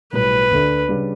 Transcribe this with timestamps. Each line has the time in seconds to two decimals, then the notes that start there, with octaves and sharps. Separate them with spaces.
0.13 B1 A2 G3 B4
0.51 D2 D3 A3 D4
0.88 C#3 G3 D4